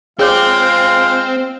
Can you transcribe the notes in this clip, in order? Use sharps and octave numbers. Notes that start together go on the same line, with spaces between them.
G#3 C4 F4 G#4 C#5 F5 D6